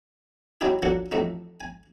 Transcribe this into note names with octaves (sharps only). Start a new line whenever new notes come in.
F#3 C#4 D#4 E4 G4 G#4
F3 F#3 A#3 D4 A4 F#5
A1 F2 A3 D#4
G#5